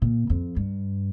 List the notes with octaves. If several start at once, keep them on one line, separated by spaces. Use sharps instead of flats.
A#2
F2
G2